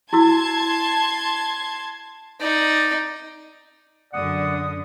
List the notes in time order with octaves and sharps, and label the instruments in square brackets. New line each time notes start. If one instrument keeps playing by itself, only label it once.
[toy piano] E4 F#4 E6 [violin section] A5 C6 G#6
[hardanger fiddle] D#4 D5
[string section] F#2 D3 [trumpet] D5 [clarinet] F#5 [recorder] D#6